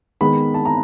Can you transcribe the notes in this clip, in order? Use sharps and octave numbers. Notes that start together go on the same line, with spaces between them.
D#3 G#3 B3 B5
A5
A#5